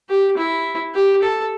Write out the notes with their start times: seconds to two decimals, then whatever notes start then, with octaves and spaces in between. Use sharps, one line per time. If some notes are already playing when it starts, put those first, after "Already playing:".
0.09 G4
0.37 E4
0.95 G4
1.22 A4